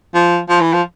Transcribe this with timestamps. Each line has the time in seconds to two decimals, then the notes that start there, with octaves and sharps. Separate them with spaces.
0.15 F3
0.49 F3
0.61 E3
0.73 F3